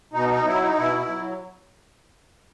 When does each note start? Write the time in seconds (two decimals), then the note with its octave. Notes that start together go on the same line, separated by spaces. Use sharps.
0.13 B2 D#4
0.29 D#4
0.46 F#3 E4
0.61 D#4
0.77 B2 E4
0.98 E4
1.09 F#3